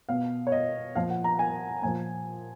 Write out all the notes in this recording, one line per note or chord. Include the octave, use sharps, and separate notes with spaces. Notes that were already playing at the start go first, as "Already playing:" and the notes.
B2 F5
C#5
D#5
A#2 F3 F5
F#5
A#5
G#5
A#2 F3 G#5